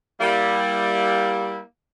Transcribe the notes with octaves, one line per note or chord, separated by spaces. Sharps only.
G3 A#3 E4